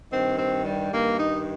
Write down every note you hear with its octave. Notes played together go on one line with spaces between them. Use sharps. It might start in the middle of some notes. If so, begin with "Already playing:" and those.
G2 D#3 C4
C4
G3
G2 D#3 A#3
D#4